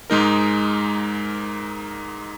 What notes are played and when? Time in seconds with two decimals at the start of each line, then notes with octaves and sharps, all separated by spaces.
0.10 G#2 G#3 D#4 A#4